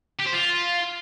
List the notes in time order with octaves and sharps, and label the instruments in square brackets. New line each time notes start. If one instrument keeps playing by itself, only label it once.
[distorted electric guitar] G4
C5
F4